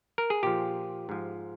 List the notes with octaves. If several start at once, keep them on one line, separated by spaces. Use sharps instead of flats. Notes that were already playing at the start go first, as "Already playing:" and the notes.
A#4
G#4
A#2 F3 G4
G#2 F3